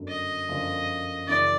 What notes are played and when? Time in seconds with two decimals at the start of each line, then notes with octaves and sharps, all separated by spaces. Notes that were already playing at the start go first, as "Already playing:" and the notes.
Already playing: G1 F#2 D3 F#3
0.08 D#5
0.48 G1 F#2 D3 F3
1.27 F#2 C#3 E3 D5